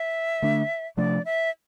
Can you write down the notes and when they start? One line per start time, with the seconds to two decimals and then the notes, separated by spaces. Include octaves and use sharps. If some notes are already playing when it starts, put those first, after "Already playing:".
Already playing: E5
0.42 D3 A3 D4
0.97 C3 F3 A3 D4 D5
1.25 E5